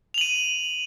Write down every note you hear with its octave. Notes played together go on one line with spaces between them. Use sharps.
D#7 F7 F#7